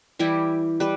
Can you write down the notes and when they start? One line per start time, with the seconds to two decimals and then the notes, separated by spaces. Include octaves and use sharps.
0.19 E3 G3 E4 G4
0.80 G3 B4